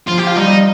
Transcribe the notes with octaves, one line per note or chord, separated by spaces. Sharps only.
F3 F4
G4
F4
G3 D#4